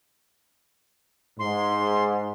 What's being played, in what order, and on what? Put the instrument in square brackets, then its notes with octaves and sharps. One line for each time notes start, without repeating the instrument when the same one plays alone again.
[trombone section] G#2 [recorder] C6